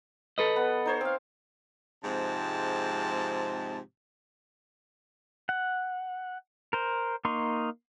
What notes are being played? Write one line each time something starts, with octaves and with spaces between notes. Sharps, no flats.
A4 B4 D#5
B3
D#4 C5 C#5
C4 F5
G#2 C3 F3 G#3 C4 A5
F#5
A#4 C5
A#3 D#4 C6 C#6